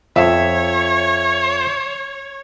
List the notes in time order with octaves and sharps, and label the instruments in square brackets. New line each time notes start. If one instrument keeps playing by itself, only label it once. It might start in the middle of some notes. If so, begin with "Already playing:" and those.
[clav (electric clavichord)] F2 [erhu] C#5 [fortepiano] E5